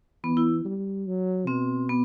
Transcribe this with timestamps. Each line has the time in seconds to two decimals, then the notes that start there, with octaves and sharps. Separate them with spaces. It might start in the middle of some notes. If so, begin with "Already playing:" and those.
0.24 E3 B3
0.37 E4
0.65 G3
1.07 F#3
1.47 B2 C4
1.89 B3